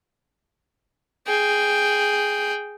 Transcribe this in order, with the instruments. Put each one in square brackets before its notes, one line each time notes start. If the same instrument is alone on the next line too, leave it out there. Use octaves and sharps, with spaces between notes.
[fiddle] G#4 G5